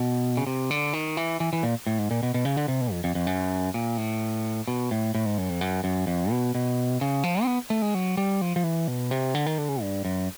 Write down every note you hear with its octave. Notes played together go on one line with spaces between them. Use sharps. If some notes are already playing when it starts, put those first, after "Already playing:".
Already playing: B2
C#3
C3
D3
D#3
E3
E3
E3
A#2
A2
G#2
A#2
B2
B2
C#3
D3
C3
B2
F2
F2
F2
F#2
A#2
A2
B2
A2
A2
G#2
F#2
F2
F#2
F#2
F2
B2
B2
C#3
F3
C4
B3
A3
G#3
F#3
G3
F3
F3
E3
B2
C3
D3
D#3
D3
C#3
G2
F#2